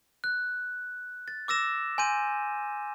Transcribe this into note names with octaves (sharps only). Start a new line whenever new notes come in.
F#6
A6
D6 E6 A#6 E7
G#5 C6 G6 D#7